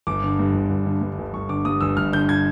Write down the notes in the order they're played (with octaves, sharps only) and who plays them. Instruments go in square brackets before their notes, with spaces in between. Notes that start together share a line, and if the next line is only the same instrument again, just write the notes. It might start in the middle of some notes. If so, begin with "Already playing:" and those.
[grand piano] G1 D6
D3
G2
G1
G1
D3
G2
G1
G1 C#6
D3 D6
G2 D#6
G1 E6
G1 F6
D3 G6
G#6